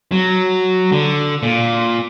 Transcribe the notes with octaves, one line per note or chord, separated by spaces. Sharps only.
F#3
D3
A#2